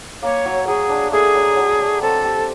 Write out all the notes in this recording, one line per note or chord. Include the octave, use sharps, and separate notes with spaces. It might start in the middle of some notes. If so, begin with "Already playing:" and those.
A#3 C#5
F#3
F#3 G#4
D4
A3 G#4
F#3
F#3
D4
C4 A4
G4